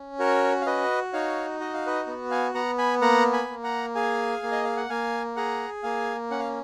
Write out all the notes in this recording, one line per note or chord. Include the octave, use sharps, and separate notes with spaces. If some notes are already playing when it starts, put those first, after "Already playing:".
Already playing: C#4
F#4 A#4 C#5
F5
F#4 B4 D#5
D#4 C#5 F5
F#4 D#5
F5
B4 D#5
B3
F5 G#5
B3 F#5 A#5
G#5 B5
A#3 F#5 A#5
G#5 B5
A#3
F#5 A#5
G#4 F5 G#5
A#3
D#5
F5
F#5
A#3 F5 G#5
G#4 F#5 A#5
A#3 F5 G#5
C#4 F#5
F5